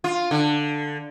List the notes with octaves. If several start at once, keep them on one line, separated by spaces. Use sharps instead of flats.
F4
D3